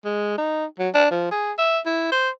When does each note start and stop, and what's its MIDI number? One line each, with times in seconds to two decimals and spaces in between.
0.05 0.37 56
0.38 0.65 63
0.79 0.89 54
0.94 1.07 62
1.11 1.30 53
1.31 1.52 68
1.58 1.79 76
1.86 2.09 64
2.12 2.29 72